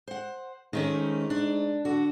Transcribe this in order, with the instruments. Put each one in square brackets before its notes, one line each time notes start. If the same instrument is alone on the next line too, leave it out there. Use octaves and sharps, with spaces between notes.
[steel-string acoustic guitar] C5 F#5
[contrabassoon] G#2 [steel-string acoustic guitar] D#3 A3 C#4
[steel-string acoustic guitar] D4
[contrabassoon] D3 [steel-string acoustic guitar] F#4